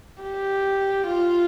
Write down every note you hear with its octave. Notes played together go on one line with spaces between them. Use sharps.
G4
F4